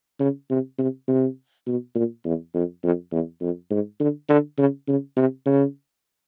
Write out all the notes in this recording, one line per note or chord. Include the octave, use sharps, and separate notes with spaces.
C#3
C3
C3
C3
B2
A#2
E2
F2
F2
E2
F2
G#2
D3
D3
C#3
C#3
C3
C#3